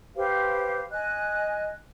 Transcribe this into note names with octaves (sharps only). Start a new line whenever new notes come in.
G4 B4 C5 F5
D#5 G#5 F#6